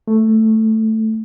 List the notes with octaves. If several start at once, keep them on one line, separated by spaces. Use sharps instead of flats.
A3